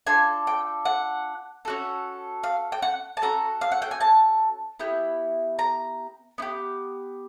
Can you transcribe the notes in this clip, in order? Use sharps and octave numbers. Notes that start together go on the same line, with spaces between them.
D4 F4 A4 G#5
G5
F#5
C#4 F#4 A4
F5
G5
F#5
A5
C#4 F#4 A4 A#5
F5
F#5
G5
G#5
A5
B3 E4 G4
A#5
B3 E4 G4